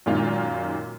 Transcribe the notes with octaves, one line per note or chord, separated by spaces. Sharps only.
F#2 A#2 D#3 G#3 A#3 F4